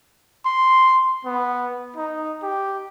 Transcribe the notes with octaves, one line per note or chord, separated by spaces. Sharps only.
C6
B3
D#4
G4